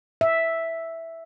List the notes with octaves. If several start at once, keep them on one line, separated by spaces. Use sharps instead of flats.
E5